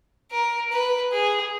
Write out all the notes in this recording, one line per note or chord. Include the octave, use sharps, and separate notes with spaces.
A#4
B4
G#4